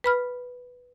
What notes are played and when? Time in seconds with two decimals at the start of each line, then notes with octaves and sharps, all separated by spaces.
0.04 B4 B5 F6